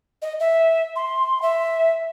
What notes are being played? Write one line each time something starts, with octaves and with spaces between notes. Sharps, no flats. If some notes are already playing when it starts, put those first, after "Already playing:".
D#5
E5
C6
E5